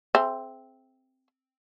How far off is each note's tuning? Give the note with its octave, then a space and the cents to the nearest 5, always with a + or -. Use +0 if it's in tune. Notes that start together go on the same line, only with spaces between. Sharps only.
C4 +0 G#4 +35 E5 +20